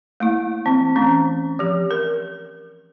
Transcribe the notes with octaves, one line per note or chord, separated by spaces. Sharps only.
A3 A#3 E4
E3 C4
E3 A3 C#4
F3 G4
A#4